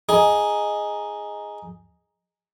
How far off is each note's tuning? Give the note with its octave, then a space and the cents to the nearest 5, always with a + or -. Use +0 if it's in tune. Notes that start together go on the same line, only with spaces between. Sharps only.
D#4 +0 G#4 +0